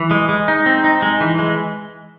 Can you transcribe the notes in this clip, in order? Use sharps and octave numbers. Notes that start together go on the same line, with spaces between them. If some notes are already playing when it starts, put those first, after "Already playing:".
Already playing: E3
G#3
G#3
D#4
C4
D#4
G#3
E3
G#3